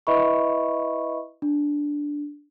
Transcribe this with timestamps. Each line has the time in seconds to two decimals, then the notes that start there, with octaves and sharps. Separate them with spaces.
0.07 E4 B4 D#5 E5 B5 C#6
1.42 D4